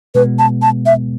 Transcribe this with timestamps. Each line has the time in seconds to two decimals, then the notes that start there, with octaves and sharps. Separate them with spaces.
0.15 B2 G#3 B3 B4
0.39 A5
0.62 A5
0.86 E5